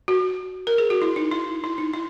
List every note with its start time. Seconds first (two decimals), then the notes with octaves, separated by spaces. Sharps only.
0.08 F#4
0.67 A#4
0.78 G#4
0.90 F#4
1.02 E4
1.16 D#4
1.32 E4
1.64 E4
1.78 D#4
1.94 E4